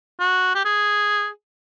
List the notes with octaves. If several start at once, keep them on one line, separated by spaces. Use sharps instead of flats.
F#4
G4
G#4